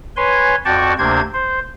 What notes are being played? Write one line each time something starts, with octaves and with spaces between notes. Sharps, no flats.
B4 C#5 G#5 C6
F2 F#4 D5 G5 A5 C#6
D2 C3 A#3 D4 C5 G#6
C5